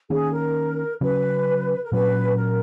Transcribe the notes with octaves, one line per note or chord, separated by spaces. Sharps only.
D#3 A#3 C#4 G#4
A#4
C#3 F#3 C#4 B4
A#4
A#2 F#3 C#4 B4
A#4